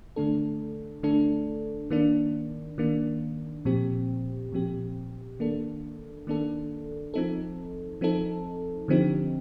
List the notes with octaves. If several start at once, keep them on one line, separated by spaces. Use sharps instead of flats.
D3 A3 D4 A4
D3 A3 D4 A4
D#3 A#3 D4
D#3 A#3 D4
A#2 F3 C4 G4
A#2 F3 C4 G4
D#3 A#3 D4 A4
D#3 A#3 D4 A4
F3 C4 D#4 A4
F3 C4 D#4 A4
D3 F3 C4 D#4 G4